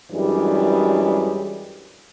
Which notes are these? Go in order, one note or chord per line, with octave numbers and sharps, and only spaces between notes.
F#2 E3 G3 G#3 D4